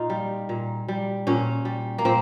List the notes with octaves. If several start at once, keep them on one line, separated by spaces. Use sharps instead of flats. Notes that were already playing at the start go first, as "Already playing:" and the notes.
Already playing: A#2 D#4 F4
G3
A#2
G3
A#2 C#4
G3
A#3
A#2 C4